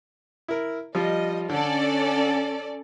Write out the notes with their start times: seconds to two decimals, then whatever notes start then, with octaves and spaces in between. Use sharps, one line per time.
0.48 E4 A#4
0.95 F3 G3 F4 D#5
1.50 D3 C#4 A4 D5